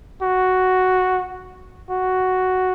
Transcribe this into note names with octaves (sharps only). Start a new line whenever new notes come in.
F#4
F#4